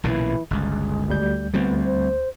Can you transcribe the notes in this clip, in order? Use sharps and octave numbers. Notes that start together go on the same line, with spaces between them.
B1 A#2 C#3 E3
G1 C#2 G#3
D2 G3 G6
D2 G3 B3 C4
C5